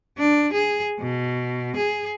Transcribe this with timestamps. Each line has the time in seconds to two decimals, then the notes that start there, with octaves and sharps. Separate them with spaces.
0.18 D4
0.53 G#4
1.00 B2
1.76 G#4